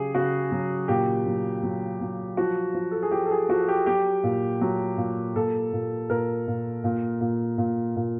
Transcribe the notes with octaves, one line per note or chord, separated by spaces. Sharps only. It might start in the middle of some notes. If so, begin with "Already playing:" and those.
Already playing: C#3 F#3 G4 G#4
C#3 F#4
F#3
A#2 G4
F#3
F#3
F#3
F3 F#4
F3
A4
G#4
F3 G4
A4
G#4
F3 F#4
G4
F#3 G4
A#2
F#3
A#2
A#2 A4
A#2
A#2 A#4
A#2
A#2
A#2
A#2
A#2